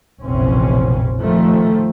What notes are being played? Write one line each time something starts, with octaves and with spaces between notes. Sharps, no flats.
F1 A#1 B2 E3 C4 C#4
D#3 F3 A3